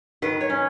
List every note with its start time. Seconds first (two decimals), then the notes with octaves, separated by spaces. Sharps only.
0.22 D#3 B4
0.41 C#5
0.50 C#4